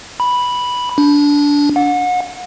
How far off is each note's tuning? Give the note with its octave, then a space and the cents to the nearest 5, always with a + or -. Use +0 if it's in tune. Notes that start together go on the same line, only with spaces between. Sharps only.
B5 -5
D4 -20
F#5 -35